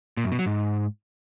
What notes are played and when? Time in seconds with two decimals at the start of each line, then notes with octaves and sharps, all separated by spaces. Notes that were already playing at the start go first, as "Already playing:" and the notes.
0.17 A#2
0.25 F#2
0.32 B2
0.39 F#3
0.46 G#2